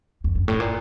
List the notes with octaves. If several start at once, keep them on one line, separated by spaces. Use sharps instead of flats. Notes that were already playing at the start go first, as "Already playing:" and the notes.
F2
G2
A2
A#2